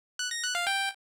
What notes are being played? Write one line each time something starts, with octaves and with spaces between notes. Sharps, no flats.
F#6
A#6
F#6
F5
G5